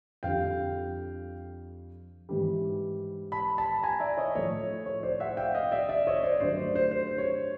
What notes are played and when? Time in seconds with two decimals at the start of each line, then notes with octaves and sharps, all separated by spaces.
0.23 F2 D3 G3 F5 G5
2.29 G#2 E3 G3
3.32 A5 B5
3.58 A5 B5
3.83 G#5 A#5
4.00 D5 E5
4.17 C#5 D#5
4.35 A2 F3 A3 C#5
4.86 C#5
5.03 C5 D5
5.20 E5 F#5
5.37 F5 G5
5.55 D#5 F5
5.71 D5 E5
5.89 D5 E5
6.07 C#5 D#5
6.23 C5 D5
6.40 G2 D3 F#3 A3 C5 D5
6.75 C5
6.91 C5
7.18 C#5